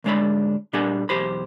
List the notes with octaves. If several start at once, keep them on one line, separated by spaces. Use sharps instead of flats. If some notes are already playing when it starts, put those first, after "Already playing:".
D2 G#2 G#3 D4 C#5 B5
A#2 G3 D4 A4 F#5 G#5
B1 E2 G4 C5 B5